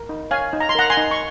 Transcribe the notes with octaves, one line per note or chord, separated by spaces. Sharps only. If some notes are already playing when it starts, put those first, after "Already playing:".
Already playing: A#4
D#4
C#5 F5 G#5
D#4
A#5
C6
A#4 F#5 A#5
G#5 C6
D#4
C#6